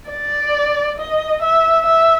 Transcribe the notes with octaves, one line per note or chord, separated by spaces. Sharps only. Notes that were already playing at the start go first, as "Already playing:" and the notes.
D5
D#5
E5
E5